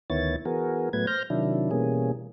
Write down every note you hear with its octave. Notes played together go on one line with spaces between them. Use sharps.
D2 D#3 B3 E4 C#5 A6
E3 B3 F#4 G#4 A#4
A2 F#3 A3 B3 B4 G#6
C5 F6 G6 A#6
C3 D#3 F#3 D4 E4
B2 E3 G3 A#3 C#4 G#4